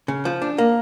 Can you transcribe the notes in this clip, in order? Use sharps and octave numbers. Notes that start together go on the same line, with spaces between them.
C#3
F3
D4
A#3